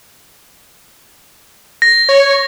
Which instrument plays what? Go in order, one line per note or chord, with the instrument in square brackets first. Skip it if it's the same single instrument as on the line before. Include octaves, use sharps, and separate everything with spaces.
[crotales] A#6
[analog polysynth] C#5